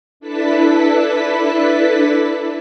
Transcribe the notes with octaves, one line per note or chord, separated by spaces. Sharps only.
D4 E4 A4 B4 A5 B6